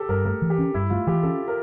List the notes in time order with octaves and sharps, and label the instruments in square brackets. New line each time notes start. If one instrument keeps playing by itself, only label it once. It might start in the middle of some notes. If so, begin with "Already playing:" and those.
Already playing: [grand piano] G4 A4
[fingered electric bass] G2 [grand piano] A#4
[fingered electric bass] A3 [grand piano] A#4
[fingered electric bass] E3
[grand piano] G4
[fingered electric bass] C#4
[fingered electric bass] G2 [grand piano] E4
[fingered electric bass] A3 [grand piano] F4
[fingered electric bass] E3 [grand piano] G4
[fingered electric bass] C#4 [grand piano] A4
[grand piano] A#4